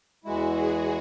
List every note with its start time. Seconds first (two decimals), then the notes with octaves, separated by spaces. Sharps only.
0.25 E2 E3 G#3 E4 F#4
0.54 G#4